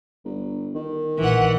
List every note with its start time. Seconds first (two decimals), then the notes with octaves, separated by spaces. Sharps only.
0.25 G1
0.75 D#3
1.19 A#1 E3 F#5